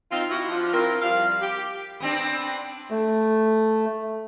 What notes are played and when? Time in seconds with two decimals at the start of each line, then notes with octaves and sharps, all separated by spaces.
0.10 C4 D#4 F4
0.30 E4 F#4
0.49 F3 D4 F4
0.73 C4 E4 F4 A#4
1.01 F3 G3 F5
1.40 G4
2.00 B3 C4 D4
2.91 A3